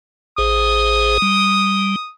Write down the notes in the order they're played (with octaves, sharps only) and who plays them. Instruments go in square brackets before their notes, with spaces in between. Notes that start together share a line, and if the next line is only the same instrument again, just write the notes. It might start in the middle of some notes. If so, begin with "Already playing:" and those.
[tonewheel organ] A1 G#4 C5 [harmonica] D#6
[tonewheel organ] G3